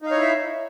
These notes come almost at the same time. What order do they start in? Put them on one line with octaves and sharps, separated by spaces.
D#4 F5 C#5 E4 E5